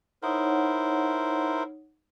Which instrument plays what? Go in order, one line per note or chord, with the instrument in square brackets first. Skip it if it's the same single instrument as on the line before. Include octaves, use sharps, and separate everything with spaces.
[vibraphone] D#4 C#5 F#5 [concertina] E4 A#4 C5